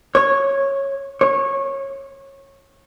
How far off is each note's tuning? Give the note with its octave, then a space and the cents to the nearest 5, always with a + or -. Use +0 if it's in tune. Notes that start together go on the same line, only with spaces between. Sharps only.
C#5 -10
C#5 -20